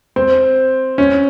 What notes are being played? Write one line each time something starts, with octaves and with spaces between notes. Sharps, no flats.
C4
C#4